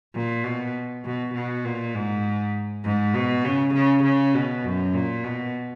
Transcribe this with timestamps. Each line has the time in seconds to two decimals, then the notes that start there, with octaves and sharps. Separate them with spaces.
0.15 A#2
0.44 B2
1.04 B2
1.34 B2
1.64 A#2
1.95 G#2
2.84 G#2
3.14 B2
3.45 C#3
3.74 C#3
4.04 C#3
4.34 B2
4.64 F#2
4.94 A#2
5.24 B2